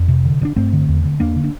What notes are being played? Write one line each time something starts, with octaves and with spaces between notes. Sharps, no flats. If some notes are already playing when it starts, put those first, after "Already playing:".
Already playing: F2
C3
D3
G2
D4
G2 A3 C4
D3
E2
D3
E2 A#3 D4
D3
D4